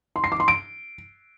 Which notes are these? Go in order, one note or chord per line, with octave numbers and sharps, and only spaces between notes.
C6
C7
D6
C6
D7